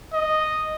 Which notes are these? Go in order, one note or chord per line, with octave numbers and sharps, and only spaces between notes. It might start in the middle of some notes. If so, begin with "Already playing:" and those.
D#5